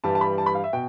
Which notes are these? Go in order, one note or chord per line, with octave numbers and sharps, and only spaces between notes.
G2 E3 G3 A5
A5
B5
A5
B5
F5
E5
B2 G5